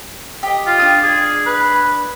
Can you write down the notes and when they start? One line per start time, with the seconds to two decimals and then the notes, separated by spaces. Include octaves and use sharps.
0.43 G4 D#5
0.67 F4
0.79 D4 D#6
1.03 G#4
1.47 B4